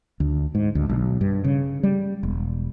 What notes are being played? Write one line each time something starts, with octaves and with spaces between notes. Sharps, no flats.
D2
G#2
D2
B1
G2
C#3
G3
E1